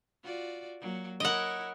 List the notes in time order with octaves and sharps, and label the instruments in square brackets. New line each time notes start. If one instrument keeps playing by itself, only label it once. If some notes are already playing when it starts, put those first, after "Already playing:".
[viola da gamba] F4 F#4 D5
F#3 A#3
[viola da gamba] E4 A#4 C#5 [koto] D#5 F#5